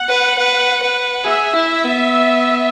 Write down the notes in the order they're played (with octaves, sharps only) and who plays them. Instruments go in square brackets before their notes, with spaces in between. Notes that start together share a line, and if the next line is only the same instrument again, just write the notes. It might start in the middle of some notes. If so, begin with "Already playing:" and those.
Already playing: [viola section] F#5
[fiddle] B4
B4
B4
[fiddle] G#4 [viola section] E5
[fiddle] E4
B3